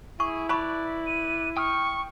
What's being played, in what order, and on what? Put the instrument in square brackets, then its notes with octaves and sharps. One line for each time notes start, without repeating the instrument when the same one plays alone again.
[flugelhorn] E4 [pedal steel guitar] G#4 [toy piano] C#6
[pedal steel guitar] B4 D5 [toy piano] A5 B5 C#6
[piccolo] D#7
[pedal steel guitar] G5 D#6 F6 [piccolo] C#6